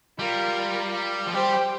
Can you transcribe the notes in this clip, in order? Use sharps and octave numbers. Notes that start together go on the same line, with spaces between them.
G3 F4 A#4
F3
G3 G4 C5